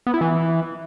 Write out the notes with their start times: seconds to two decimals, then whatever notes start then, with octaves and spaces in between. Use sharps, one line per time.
0.07 B3
0.14 E4
0.21 E3